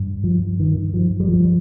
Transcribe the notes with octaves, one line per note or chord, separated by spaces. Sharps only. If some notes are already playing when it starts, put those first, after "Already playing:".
Already playing: G2
F3
D#3
F3
G3
F3